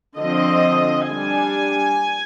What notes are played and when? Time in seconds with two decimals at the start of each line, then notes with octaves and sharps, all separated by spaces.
0.18 D3 F3 C4 D#5
1.08 G3 D4 G#5